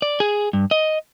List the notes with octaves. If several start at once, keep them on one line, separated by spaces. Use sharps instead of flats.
D5
G#4
G2
D#5